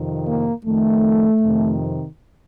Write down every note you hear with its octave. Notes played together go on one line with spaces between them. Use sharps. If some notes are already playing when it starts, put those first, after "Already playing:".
Already playing: F2 C3 D#3
A#3
F2 D#3 A3
F2 C3 D#3